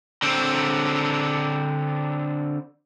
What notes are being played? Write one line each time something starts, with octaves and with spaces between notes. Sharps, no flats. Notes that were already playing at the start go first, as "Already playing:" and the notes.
D3 C4